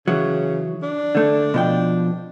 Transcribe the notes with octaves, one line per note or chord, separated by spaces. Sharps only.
C#3 E3 F#3
D4
D3 A3
B2 F3 G5